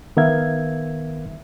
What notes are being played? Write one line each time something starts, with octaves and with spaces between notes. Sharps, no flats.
D#3 B3 A#4 E5 F5 G#6